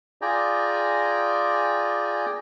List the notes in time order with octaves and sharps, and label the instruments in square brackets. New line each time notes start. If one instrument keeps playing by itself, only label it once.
[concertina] F4 G#4 D5 G5 G#5 A#5